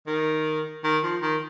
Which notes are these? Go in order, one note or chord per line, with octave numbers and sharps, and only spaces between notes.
D#3
D#3
F3
D#3